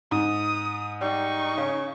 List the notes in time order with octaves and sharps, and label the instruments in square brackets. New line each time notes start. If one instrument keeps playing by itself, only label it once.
[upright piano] G#2 [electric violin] D#6
[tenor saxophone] G3 [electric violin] D#4 C#6
[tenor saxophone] C#3